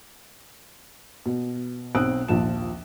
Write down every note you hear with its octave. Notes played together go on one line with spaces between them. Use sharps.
B2
B1 C4 D#6 E6 F#6 D7
A#1 D#2 F3 A5 E7